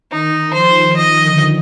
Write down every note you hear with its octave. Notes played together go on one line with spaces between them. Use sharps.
D#3 D#4
F3 C5
D#3 D#5
D3